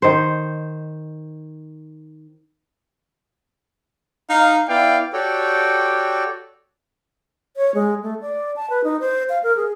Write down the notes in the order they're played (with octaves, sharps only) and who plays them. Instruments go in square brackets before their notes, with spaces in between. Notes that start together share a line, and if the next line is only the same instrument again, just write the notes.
[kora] D#3 C5
[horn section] D#4 F5
B3 E4 D5 F5 G5
[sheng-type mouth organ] F#4 G4 A4 C#5 D5 G5
[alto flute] C#5
G#3
A3
D5
A5
B4
D#4
C5
F5
A#4
G#4